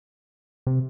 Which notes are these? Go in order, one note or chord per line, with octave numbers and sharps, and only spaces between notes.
C3